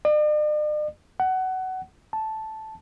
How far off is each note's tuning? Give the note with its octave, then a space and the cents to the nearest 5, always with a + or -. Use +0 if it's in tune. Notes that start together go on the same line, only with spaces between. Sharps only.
D5 +45
F#5 +20
A5 -5